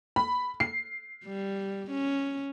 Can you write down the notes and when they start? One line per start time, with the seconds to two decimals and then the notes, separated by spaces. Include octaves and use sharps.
0.16 B5
0.60 C7
1.26 G3
1.91 C#4